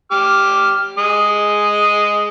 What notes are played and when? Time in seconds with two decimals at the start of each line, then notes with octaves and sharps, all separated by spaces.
0.12 G4 D6 F6
0.98 G#3 D#6